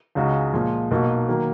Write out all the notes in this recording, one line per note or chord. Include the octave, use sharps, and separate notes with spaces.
C#2 C#3 G#3 D#4 F#4
A#2 F3 G#3
B1 B2 A#3 D#4 F#4
D#3 F#3 A#3